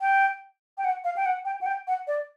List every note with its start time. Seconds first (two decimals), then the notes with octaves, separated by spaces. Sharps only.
0.01 G5
0.78 G5
0.85 F#5
1.04 F5
1.17 G5
1.26 F#5
1.45 G5
1.61 F#5
1.66 G5
1.87 F#5
2.07 D5